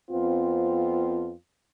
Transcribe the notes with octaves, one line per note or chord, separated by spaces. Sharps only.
F2 B3 C4 F4